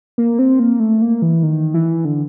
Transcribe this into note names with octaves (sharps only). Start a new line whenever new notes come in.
A#3
C4
A#3
A3
A#3
E3
D#3
E3
D3